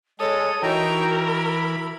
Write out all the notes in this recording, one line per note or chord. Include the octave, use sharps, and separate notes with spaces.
G#3 A4 C#5 D#6
E3 D#4 F#4 A#4 G5 A#5
B5